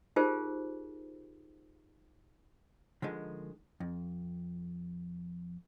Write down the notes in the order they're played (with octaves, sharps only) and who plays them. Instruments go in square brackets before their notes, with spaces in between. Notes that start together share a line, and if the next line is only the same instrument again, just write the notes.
[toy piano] D#4 F4 G4 G#4 A#4 C5
[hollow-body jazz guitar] D3 D#3 F3 G#3
F2